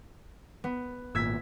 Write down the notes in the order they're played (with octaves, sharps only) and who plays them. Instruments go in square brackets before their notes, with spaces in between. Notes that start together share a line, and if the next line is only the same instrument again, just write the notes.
[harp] B3
[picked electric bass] G#1 A#2 [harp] E6 G#6 B6